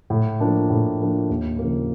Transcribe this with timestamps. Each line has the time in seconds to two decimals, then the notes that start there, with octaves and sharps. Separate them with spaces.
0.10 A2
0.40 F3 A#3 D4
0.70 A2
1.00 F3 A#3 D4
1.30 D#2
1.59 C#3 F3 A#3